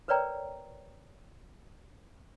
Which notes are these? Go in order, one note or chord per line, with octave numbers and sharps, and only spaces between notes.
A#4 B4 C#5 D5 G5 A#5